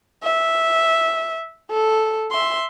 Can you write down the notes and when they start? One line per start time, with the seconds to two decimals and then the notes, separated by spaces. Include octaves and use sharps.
0.23 E5
1.71 A4
2.31 E5 C6